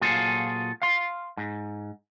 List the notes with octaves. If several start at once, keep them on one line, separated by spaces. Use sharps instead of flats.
A#2 F#3 F4 G#4 A4 C5
F5 C6
G#2